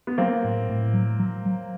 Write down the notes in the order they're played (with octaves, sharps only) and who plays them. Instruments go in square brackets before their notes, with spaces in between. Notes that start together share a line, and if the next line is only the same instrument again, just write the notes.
[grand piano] B3
[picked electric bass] F#3 [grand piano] A#3 C4
[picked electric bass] A2
A2
F#3
F#3
F#3